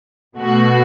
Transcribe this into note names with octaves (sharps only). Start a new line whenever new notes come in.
B2 A3 F#4